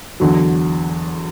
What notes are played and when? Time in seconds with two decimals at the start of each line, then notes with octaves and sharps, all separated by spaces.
0.20 E2 D3 F#3